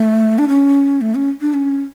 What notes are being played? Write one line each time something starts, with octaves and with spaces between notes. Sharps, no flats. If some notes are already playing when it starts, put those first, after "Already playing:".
Already playing: A3
D4
C#4
A3
C#4
D4
C#4